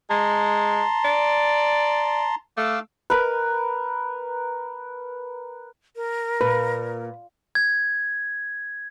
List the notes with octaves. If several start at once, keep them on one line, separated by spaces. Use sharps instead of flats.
G#3 A5 A#5 C6
D5
A3 F5 D6 E6
A#4 B4
A#4
A#2 B4
G#6